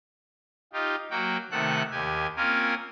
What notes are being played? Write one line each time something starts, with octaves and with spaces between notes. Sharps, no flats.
D#4 F4 G4
F#3 A#3 F#4 G5
C3 D#3 A3 A4 F#5 F#6
D#2 G4 G#5
A#3 C4 C#4 F4 A#4 G#5